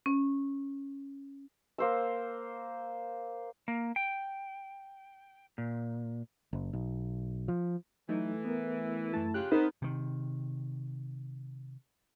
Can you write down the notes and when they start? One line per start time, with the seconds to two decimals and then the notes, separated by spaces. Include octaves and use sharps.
0.06 C#4
1.78 A#3 C5 E6
3.68 A#3
3.96 G5
5.58 A#2
6.53 F#1
6.73 B1
7.48 F3
8.09 E3 F#3 A3 D#4
8.45 B3 A#4
9.14 F#2 A3 E4 A5
9.34 C#3 F4 G4 F#6
9.52 B3 C4 D#4 A#4 C5
9.82 C3 D#3